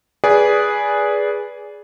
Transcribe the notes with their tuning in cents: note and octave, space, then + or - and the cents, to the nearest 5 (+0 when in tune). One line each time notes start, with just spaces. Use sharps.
G#4 +0 B4 -10 D5 -20